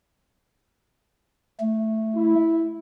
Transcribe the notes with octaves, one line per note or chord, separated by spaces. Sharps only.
A3
E4